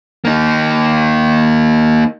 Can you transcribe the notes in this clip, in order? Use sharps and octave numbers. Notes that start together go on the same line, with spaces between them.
A#3 D#4